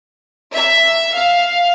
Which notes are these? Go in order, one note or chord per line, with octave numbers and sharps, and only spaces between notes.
E5
F5